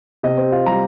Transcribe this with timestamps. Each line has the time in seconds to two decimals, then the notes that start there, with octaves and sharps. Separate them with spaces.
0.23 C3 D#5
0.37 C4
0.52 F4
0.66 G3 A#5